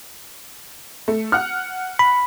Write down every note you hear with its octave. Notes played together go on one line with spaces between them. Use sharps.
A3
F#5 F6
B5